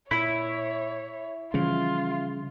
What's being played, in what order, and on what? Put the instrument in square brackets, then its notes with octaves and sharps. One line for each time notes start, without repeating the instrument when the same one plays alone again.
[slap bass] A#2 [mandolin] E4 [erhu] C#5
[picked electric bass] C#3 [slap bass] E3 F3 G3 [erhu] F4